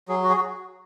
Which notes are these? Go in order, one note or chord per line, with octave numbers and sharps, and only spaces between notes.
F#3 G#4
F#4
G#4
F#4